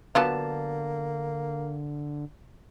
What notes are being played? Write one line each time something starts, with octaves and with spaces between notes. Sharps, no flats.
D3 F#3 A#3 B3 D4 F4 A5